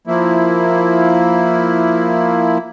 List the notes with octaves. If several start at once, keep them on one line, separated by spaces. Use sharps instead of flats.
F3 A#3 E4